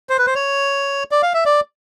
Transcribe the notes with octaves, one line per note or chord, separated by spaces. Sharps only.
C5
B4
C5
C#5
D5
F5
E5
D5